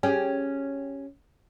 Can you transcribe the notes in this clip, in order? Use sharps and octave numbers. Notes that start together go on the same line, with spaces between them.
C#4 G4 G#4